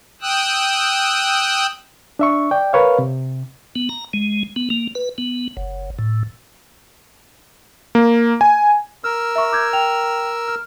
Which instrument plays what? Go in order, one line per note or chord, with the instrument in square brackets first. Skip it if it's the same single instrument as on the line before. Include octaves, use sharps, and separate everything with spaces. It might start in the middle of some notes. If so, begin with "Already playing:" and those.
[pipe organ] G5 D#6 E6 F#6
[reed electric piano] D4 E5 C#6
D5 G5
A#4 B4 C#5 F5
C3
[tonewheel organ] B3
A#5
G#3
B3
A#3
B4
B3
F#1
A2
[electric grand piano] A#3
G#5
[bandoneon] A#4 E6 [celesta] F6
[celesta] E5 C#6
D6 G6 G#6
G5 F7
F6